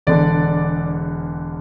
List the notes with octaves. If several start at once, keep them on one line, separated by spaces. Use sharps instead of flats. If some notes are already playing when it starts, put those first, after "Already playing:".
E1 E2 D3 D5